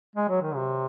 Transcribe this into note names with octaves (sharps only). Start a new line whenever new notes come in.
G#3
F#3
D#3
C3